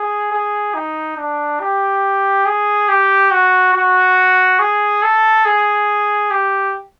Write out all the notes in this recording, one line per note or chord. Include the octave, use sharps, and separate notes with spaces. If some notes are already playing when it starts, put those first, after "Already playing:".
Already playing: G#4
G#4
D#4
D4
G4
G#4
G4
F#4
F#4
G#4
A4
G#4
G4